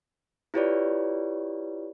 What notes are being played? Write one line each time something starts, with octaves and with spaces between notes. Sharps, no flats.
E4 F4 G4 B4 C#5 D5